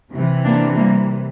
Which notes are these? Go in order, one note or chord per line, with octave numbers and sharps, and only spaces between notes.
C3 E3
A#3 D4
G3 A#3